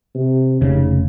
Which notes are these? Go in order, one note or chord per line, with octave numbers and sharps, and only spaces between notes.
C3
F1 G#2 C#3